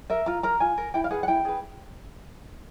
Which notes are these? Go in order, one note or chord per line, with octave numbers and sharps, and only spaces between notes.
A#4 E5
F4 A#5
A#4 A#5
F4 G#5
A#4
E4 G5
F5
G#4 B4 F#5
F#5
E4 G5
G#4 B4